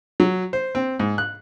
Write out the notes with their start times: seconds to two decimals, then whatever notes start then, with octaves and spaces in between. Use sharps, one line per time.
0.20 F#3
0.53 C5
0.75 C4
0.99 G#2
1.18 F#6